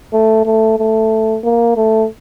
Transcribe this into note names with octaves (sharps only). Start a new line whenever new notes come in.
A3
A3
A3
A#3
A3